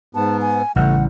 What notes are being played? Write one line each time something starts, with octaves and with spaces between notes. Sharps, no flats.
G#2 B3 A5
G#5
A1 C#3 G3 A3 F#5